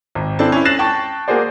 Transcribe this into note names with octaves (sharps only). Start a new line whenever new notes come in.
G#1
C4 D4 E4 A4 A5
C#4 E4
F#6 A6 A#6 C7 E7 F#7
G5 A5 C#6
A#3 F#4 G#4 C5 D5